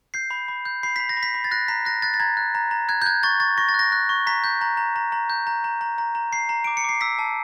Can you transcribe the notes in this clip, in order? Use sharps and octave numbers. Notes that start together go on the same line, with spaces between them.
G6 C7
B5
B5
G6
B5 C7
B5 B6
A#6
B5
B6
B5
A6
F#6 A#6
A#5 B6
F#6 A#6
F#6 A6
A6
A#5 G#6
F#6
A#5
A#5
F#6 G#6
G6
F#6 G#6
C#6 A6
C#6 A6
C#6 A#6
A6
F#6 A#6
F#6
C#6
A#5 B6
G6
A#5
A#5
A#5
A#5
G6
A#5
A#5
A#5
A#5
A#5
A#5 C7
A#5
D6 D7
C#7
D6 C7
E6 B6
A5